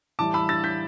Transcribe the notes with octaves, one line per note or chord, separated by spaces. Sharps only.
A2 E3 G3 A5 D6
B5 E6
E6 A6
G6 B6